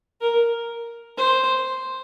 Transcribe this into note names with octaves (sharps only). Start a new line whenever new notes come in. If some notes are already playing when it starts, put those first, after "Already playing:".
A#4
C5